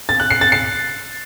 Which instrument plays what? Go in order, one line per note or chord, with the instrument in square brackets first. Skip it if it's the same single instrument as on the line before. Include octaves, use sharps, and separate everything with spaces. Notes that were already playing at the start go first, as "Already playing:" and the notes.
[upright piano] A6
F#6
C7
A6
C7